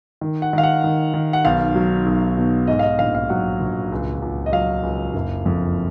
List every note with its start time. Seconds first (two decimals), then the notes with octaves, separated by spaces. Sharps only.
0.21 D#3
0.42 F#5
0.53 D#3 F5
0.63 F#5
0.84 D#3
1.14 D#3
1.33 F#5
1.44 B1 F5
1.75 F#3
2.06 B1
2.37 B2
2.67 G#2 D#5
2.79 F5
2.83 D#5
2.99 A#1 F5
3.15 F5
3.29 F#3 F#5
3.60 A#1
3.92 C#2
4.22 C#2
4.46 D#5
4.52 F#3 F5
4.83 C#2
5.14 F#1
5.46 F2